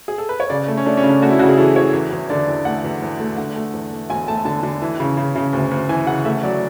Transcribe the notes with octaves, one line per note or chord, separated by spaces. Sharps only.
G#4
A4
B4
C#5
C#3 D5
A3
C#4
A3 D4
C#4
C#3
D4
A3 F#4
E4
C#3 F#4
G#4
E3 A4
E3 C#5
E2
E2
D3 D5
E2
A3 F#5
E2
E2
A3
D3 F#5
A3
E2
A3
E1 G#5
A3 A5
D3 A5
D3
E3
C#3
C#3
C#3
D2
D2
E3 G#5
C#3 F#5
A3 E5
F#3 D5